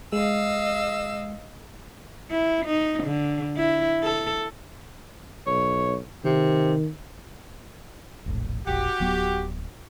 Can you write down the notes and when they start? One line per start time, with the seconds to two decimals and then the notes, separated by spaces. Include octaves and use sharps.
0.12 G#3 D#5 F5 E6
2.30 E4
2.65 D#4
3.03 D3
3.56 E4
4.03 A4
5.47 B1 C#5
6.25 C3 D#3
8.26 E1 A#1 A2
8.67 E1 A#1 F#4 G4
9.00 D1 F#3 B3